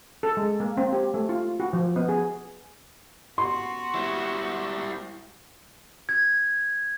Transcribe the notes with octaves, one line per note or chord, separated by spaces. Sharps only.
A4
G#3
A#3
C4
G4
A3
F4
F#4
F3
B3
G#4
B3 F#4 C6
G3 E4
G#6